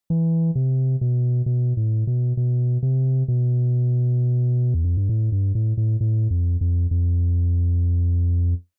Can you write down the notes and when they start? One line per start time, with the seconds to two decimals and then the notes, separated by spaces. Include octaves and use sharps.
0.10 E3
0.55 C3
1.01 B2
1.46 B2
1.77 A2
2.07 B2
2.37 B2
2.83 C3
3.28 B2
4.74 E2
4.85 F2
4.97 G2
5.09 A2
5.32 G2
5.55 A2
5.77 A2
6.01 A2
6.30 F2
6.61 F2
6.91 F2